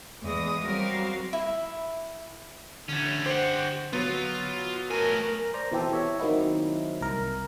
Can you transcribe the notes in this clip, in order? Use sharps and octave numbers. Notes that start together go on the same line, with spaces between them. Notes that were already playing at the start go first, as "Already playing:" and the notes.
E2 G#3 G#4 D#6 A#6
F#3 G3 C4 F#4 A#4 F5
E4
D3 A3 C#4
G4 C5 F#5
F#3 B3 F4
A3 A#4 G#5
C5 D5 A#5
B2 E3 C4 G4 A4
C#5 E5
D#3 F#3 A#3 C4 D#4 E4
C2 A#4